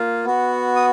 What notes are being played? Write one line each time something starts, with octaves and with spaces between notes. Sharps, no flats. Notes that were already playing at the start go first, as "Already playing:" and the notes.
Already playing: A#3 F4
B3 F#4
D#6